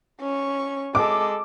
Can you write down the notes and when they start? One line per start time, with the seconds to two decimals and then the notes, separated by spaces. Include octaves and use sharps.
0.21 C#4 C#6
0.95 G#3 A4 D6